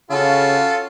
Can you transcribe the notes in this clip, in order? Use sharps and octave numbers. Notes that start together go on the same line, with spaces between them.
C#3 F4 F#4 A4